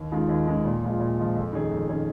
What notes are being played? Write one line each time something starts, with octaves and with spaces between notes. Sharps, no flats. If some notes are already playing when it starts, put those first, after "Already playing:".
Already playing: D#2
D#3 G#3 F4
D#2
D#3 G#3 F4
A#2
F3 G#3 F4
A#2
F3 G#3 F4
F2
D#3 C#4 G#4
F2
D#3 C#4 G#4